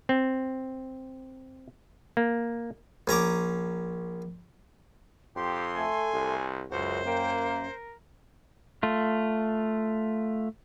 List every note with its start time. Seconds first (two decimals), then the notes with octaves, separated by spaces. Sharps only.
0.09 C4
2.17 A#3
3.08 A#1 C#4 A#5 D6
5.36 F2 G4 C6
5.76 A3 A4 G#5
6.14 C2
6.71 C#2 F#2 F#4 C5
7.06 A#3 G5
7.46 A#4
8.83 A3 F4